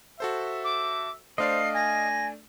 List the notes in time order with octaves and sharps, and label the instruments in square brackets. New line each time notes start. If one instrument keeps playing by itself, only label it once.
[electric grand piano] F#4 A4 C5 [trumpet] E5
[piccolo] D6
[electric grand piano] A3 D4 D5 [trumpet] C5 [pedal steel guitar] D#5 F5 [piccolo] C7
[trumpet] G#5 [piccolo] A#6